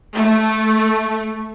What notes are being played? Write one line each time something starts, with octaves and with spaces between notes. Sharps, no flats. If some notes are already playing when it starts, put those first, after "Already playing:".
A3